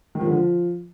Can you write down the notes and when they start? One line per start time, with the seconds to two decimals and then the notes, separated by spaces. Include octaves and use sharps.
0.15 D#3
0.21 F3
0.27 D3
0.32 F3